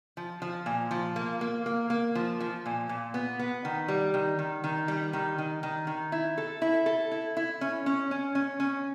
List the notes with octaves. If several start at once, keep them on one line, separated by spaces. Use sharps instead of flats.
F3
F3
A#2
F3
A#3
A#3
A#3
A#3
F3
F3
A#2
A#2
B3
B3
D#3
G3
D#3
D#3
D#3
G3
D#3
D#3
D#3
D#3
E4
A4
E4
A4
E4
E4
C#4
C#4
C#4
C#4
C#4